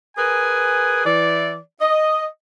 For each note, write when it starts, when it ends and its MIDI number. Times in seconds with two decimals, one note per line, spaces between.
0.17 1.02 68
0.17 1.02 70
0.17 1.02 71
0.17 1.02 80
1.04 1.56 52
1.04 1.56 74
1.81 2.24 75